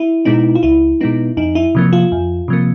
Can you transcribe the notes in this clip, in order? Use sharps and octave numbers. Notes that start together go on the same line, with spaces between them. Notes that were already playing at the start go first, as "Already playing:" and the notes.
Already playing: E4
B2 G#3 B3 D#4
F4
C#2 E4
B2 G#3 B3 D#4
F2 D#4
E4
C3 F3 A#3
F4
F2
C3 F3 A#3